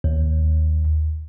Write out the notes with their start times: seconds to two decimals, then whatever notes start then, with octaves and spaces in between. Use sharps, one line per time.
0.04 D#2